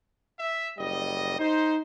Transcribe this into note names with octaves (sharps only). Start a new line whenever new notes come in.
E5
F#1 G3 D#5
D#4 C5